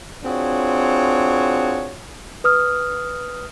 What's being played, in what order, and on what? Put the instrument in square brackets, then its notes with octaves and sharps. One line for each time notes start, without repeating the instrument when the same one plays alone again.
[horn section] C4 D4 F4 F#4 G#4 C#5
[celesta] B4 D#6 F6